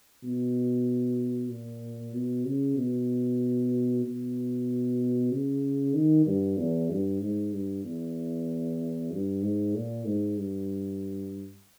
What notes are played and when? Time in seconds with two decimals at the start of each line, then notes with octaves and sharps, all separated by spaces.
0.23 B2
1.50 A#2
2.14 B2
2.45 C#3
2.77 B2
4.05 B2
5.31 C#3
5.94 D#3
6.26 G2
6.57 E2
6.90 G2
7.21 G#2
7.53 G2
7.84 E2
9.11 G2
9.43 G#2
9.75 A#2
10.06 G#2
10.37 G2